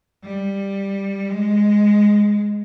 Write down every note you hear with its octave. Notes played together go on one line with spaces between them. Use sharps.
G3
G#3